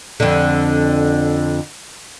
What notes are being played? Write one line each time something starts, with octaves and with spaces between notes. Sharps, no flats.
F2 D3